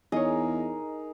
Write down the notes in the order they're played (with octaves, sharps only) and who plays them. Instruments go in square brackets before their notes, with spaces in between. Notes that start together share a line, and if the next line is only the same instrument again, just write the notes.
[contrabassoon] E2 [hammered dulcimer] D#4 G#4 A#4 [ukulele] C#5 D#5